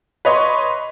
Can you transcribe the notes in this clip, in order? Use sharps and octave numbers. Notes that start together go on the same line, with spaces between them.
B4 C#5 D#5 C6 C#6